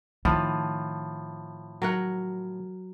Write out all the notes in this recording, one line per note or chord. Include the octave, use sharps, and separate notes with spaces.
A2 D#3 F3
F#3 A#4 F#5